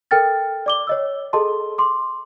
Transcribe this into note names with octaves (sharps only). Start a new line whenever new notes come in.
A4 A#4 G5 F6 A6
D5 D6 G7
C#5 D#5 E6
G#4 A4 D#5 A5 C6
C6 D6